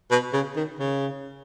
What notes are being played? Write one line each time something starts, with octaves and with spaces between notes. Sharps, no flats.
B2
C#3
D#3
C#3